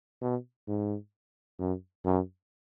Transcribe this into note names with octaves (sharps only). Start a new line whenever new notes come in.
B2
G#2
F#2
F#2